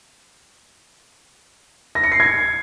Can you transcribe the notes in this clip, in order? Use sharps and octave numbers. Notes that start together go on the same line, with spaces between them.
A#6
C#7
C7
G#6